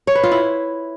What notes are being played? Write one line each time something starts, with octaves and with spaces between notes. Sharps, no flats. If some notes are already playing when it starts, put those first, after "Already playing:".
C#5
B4
F4
E4